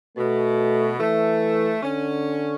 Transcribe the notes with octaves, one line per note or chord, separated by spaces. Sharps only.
B2 A3
E3 A3
D3 C#4